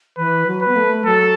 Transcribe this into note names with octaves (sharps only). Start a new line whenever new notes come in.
E3 B4
F#3
B4
B3
A3
F#3 A4